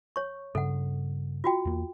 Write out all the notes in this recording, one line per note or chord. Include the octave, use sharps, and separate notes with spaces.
C#5 C#6
G2 C#3 A4 F#5
F4 F#4 G5
E2 A#3